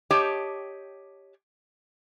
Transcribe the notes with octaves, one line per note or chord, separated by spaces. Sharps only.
G4 C#5 D#5 G5 A5